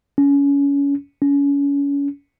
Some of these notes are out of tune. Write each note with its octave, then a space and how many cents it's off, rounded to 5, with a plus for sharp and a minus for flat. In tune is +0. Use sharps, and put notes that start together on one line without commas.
C#4 +25
C#4 +30